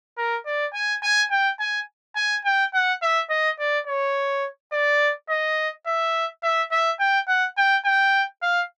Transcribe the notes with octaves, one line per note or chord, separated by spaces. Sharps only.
A#4
D5
G#5
G#5
G5
G#5
G#5
G5
F#5
E5
D#5
D5
C#5
D5
D#5
E5
E5
E5
G5
F#5
G5
G5
F5